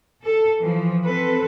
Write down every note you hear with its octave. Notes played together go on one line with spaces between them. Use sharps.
A4
E3 F3
C4 A4 B4